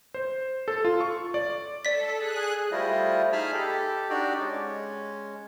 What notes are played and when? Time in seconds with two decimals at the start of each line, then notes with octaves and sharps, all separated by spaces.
0.14 C5
0.68 A4
0.85 F4
1.00 C#6
1.34 D5
1.85 A4 D5 B6
2.14 G#4 F#6
2.72 G3 A3 E4 F4 C5 D#5
3.32 D#4 G#4 G#5 A5 B5 F6
3.54 G4 A4
4.10 D4 D#4 F#4 G4 D5
4.40 G#3 C#4